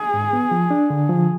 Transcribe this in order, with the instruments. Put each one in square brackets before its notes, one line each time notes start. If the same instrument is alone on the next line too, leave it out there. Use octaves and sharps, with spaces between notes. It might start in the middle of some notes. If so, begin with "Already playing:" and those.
Already playing: [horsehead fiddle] G#4
[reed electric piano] G#2
B3
F3
D4
D3
F3